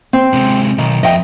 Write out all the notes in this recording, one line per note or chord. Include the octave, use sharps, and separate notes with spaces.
C4
C3 G#3
B1 D#3
F2 D#5 E5 G5